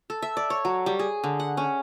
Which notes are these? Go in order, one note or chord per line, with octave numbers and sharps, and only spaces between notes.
A4
E5
D5
C#5
F#3
G3
G#4
D3
F#5
C#4